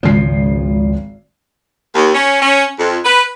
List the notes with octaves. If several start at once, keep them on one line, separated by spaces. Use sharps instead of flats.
G#1 C#2 C#3 F3 C7
D#2
C#4
C#4
F2
B4